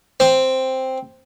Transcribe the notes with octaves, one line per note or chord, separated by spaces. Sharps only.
C4